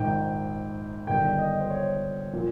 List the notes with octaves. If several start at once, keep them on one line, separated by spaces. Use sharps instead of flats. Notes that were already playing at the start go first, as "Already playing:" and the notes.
Already playing: A#1 G#2 D#3 G5
G1 G2 D#3 G5
D#5
C5
C#5
A#2 F3